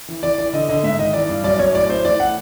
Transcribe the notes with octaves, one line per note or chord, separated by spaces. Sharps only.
E3
E3 D5
E3 D5
D3 D#5
D3 D#5
G#2 E5
D#3 D#5
E3 D5
G2
F#2 D5
F#2 C#5
A2 D5
A2 C5
E3 D5
A2 F#5